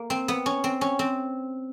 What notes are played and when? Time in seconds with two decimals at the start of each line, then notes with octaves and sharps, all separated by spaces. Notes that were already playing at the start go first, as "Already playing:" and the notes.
Already playing: A#3
0.10 C4
0.28 B3
0.46 C#4
0.64 C4
0.81 C#4
0.99 C4